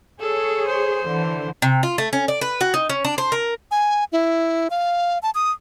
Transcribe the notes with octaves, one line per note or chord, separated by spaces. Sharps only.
G#4 A4 C#5
C5
D3 E3
C3
F4
A3
C#4
D5
B4
F#4
D#4
C#4
D4
C5
A#4
G#5
E4
F5
A5
D#6